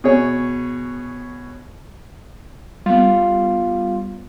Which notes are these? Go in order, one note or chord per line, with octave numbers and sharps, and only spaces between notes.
B2 G#4 C#5
G3 B3 F4